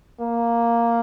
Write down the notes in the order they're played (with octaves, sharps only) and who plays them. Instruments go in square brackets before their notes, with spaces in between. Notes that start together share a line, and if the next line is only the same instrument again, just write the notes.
[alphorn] A#3